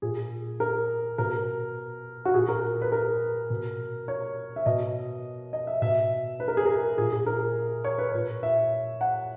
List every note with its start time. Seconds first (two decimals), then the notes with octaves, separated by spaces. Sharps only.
0.02 A#2 G#4
0.60 A#4
1.18 B2 A#4
2.25 F#4
2.34 A#2 G#4
2.49 A#4
2.82 B4
2.92 A#4
3.50 B2
4.08 C#5
4.56 E5
4.66 B2 D#5
5.53 D#5
5.67 E5
5.82 B2 E5
6.40 B4
6.48 A#4
6.57 G#4
6.66 A#4
6.98 A#2 G#4
7.12 G#4
7.26 A#4
7.84 C#5
7.98 B4
8.12 A#2 C#5
8.43 E5
9.01 F#5